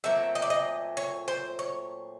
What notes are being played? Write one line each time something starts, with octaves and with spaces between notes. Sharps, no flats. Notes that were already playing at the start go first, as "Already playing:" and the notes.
A#2 F#3 A3 C4 E5
D#5
D5
D#5
C#5
C5
C#5